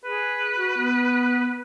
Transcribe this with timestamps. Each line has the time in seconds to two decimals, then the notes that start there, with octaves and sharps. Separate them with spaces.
0.04 G#4 B4
0.56 F#4
0.77 B3